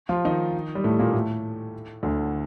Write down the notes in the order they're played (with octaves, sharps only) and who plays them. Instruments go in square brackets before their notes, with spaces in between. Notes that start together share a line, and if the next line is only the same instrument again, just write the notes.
[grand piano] F3 F4
D#3 D#4
G3
A2 A3
A#2 A#3
A2 A3
D2 D3